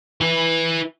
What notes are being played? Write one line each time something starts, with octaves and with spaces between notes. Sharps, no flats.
E4 B4